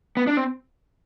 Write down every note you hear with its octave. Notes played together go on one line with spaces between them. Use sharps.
B3
D4
C4